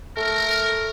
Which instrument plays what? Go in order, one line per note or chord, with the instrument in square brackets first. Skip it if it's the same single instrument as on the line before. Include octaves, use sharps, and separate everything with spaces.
[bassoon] A3 [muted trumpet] A#4